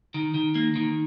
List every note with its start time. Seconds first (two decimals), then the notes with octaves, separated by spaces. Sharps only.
0.14 D#3
0.34 D#3
0.55 A#3
0.75 D#3